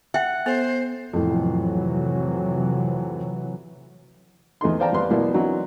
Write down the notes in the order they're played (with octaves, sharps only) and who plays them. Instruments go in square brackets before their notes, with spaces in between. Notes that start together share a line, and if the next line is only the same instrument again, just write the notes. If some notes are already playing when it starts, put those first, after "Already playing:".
[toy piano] E5 G5 [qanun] F#5
[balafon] B3 A4 [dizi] C5
[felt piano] F2 A2 [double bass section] C3 E3 F#3
[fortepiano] E2 A3 D#4 C6
C5 D5 F5 G5 A5 A#5
E2 G3 B4 D5 F5 C6
B1 B2 A#3 E4 D5
E3 F#3 C4 D4 D#4